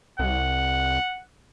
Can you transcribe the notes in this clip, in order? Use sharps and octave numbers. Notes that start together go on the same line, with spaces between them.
C2 F#5